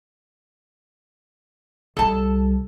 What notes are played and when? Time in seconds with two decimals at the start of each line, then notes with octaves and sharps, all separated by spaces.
1.97 C2 G3 A4 A5